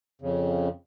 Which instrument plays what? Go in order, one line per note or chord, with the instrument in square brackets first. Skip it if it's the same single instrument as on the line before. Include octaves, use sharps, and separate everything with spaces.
[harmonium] F2 C#3